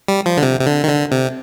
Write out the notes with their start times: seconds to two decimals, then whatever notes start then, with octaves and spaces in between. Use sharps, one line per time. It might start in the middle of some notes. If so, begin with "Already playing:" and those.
0.08 G3
0.26 F3
0.37 D3
0.43 C3
0.60 C3
0.66 D3
0.84 D#3
0.89 D3
1.12 C3